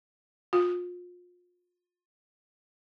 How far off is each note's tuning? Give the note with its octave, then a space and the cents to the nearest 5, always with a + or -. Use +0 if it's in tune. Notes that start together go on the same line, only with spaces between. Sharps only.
F4 +30